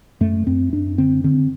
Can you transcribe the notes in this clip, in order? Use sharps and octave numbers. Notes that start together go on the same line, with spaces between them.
F#2 A3
F#2 C4
F#2 D4
D3 C4
D3 C4